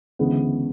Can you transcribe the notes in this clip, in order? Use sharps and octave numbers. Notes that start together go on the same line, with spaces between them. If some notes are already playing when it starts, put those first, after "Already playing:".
D2 C#3 E3 G#3 B3